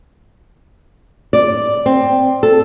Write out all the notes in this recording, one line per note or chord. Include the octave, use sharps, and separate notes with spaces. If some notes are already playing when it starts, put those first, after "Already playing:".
D5
C4
A4